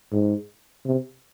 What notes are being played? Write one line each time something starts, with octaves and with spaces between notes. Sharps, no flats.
G#2
C3